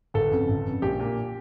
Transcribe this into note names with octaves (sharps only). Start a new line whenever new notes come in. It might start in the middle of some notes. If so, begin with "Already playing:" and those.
G1 A4
F2 C#3
G1
F2 C#3
A#1 G4
A#2